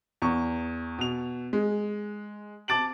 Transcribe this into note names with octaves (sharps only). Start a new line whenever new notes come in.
E2 C#6
B2 F7
G#3
A5 D6 A6 D7 F#7